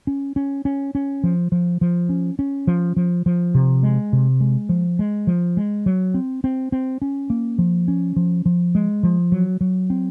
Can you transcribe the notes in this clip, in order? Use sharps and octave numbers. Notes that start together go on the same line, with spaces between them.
C#4
C#4
C#4
C#4
F3
F3
F3
C#4
C#4
F3
F3
F3
C3
G#3
C3
G#3
F3
G#3
F3
G#3
F#3
C4
C4
C4
C#4
A#3
F3
C#4
F3
F3
G#3
F3
F#3
F#3
C4